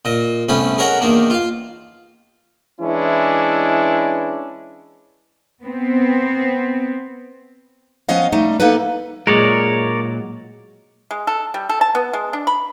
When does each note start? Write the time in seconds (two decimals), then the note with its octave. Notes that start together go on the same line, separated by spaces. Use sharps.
0.05 A#2 D#5
0.49 C2 A3 B3 C#4 B5
0.78 G#4 A#4 C#5 D#5 E5 F#5
1.01 E2 D#3 A#3 D4
1.30 F4 F5
2.81 E3 G#3 C#4 D4 E4
5.64 B3 C4
8.09 F3 B3 C#4 D#5 F5
8.32 G3 A3 D#4
8.60 A#3 B3 D#4 A4 B4
9.27 A#2 F#3 G#3 A#4 C#5 D5
11.11 G#3
11.27 A4
11.54 G3
11.69 A4
11.81 A5
11.95 B3
12.13 G#3
12.33 D4
12.47 B5